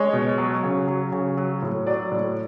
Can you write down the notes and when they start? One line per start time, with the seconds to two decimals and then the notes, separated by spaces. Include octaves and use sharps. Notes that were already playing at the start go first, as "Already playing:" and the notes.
Already playing: G#3 C#5
0.13 B2
0.38 F#3
0.63 C#3
0.88 F#3
1.12 C#3
1.37 F#3
1.62 A2
1.87 F#3 D5
2.12 A2